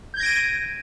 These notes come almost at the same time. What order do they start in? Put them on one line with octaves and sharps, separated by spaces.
G6 G#6 A#6 D7 D#7